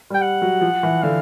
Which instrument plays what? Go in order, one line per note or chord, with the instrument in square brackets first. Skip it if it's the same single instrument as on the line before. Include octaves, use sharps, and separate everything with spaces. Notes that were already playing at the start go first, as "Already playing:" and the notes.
[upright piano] G3
[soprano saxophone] G5
F#5
[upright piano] F#3
F3
E3
[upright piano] D3 [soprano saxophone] F5